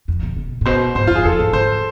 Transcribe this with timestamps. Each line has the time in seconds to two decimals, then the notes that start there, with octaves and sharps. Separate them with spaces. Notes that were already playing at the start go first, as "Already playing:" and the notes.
0.08 F2
0.23 B2
0.36 B2
0.61 A2
0.66 B2 C5
0.95 G#2 C5
1.07 F2 F4
1.15 G#4
1.25 F2 A4
1.39 G#2
1.53 G#2 C5